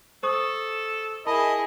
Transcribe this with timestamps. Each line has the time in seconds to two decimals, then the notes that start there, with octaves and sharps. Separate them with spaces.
0.23 A4 C5 C#6 D#6
1.26 E4 G#4 A#4 D#5 A5 B5